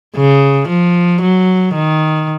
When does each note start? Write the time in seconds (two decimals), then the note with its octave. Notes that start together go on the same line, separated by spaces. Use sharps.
0.16 C#3
0.69 F3
1.22 F#3
1.74 D#3